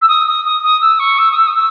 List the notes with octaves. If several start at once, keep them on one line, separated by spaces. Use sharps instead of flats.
E6
D#6
D#6
D#6
D#6
E6
C#6
E6
D#6
E6
D#6
E6